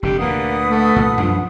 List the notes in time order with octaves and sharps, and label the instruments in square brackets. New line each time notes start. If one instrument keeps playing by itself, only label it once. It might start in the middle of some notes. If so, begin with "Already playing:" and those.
[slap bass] F1 D3 [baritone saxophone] G4
[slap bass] D2 A#2 [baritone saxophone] A#3 [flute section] B4 F#5 D#6
[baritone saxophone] A3
[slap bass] C2 A#2
[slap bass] F#2 D4 [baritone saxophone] F3